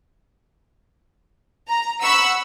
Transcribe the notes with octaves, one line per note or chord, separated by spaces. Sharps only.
A#5
F#5 B5 C#6 E6